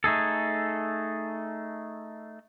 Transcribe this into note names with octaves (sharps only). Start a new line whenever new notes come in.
A3 D#4 G#4 A4